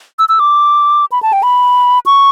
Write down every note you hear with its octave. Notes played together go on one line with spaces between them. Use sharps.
E6
E6
D6
B5
A5
G5
B5
C#6